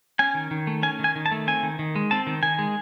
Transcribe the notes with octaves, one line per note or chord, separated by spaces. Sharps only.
C#4 G#5
D#3
D#3
A3
C#4 G#5
D#3 G#5
D#3
A5
A3
C4 G#5
D#3
D#3
G#3
C4 A5
D#3
D#3 G#5
G#3